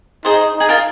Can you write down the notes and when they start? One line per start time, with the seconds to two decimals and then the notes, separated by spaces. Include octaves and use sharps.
0.25 D#4 G#4 C5
0.55 D#4
0.60 G#4
0.69 F4 A#4